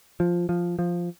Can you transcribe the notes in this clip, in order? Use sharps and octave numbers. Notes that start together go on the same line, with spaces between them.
F3
F3
F3